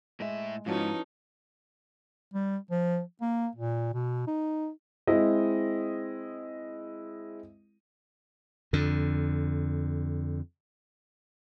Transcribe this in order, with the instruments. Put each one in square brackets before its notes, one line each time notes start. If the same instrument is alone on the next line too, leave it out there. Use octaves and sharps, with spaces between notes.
[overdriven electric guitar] A2 E5 [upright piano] G#3
[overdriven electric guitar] G#2 [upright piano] F3 F#4 [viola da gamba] C#4 D#4 [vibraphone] E4 B4 A5
[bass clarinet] G3
F3
A#3
A#2
B2
D#4
[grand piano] G#3 C4 E4 D#5
[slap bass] F2 D3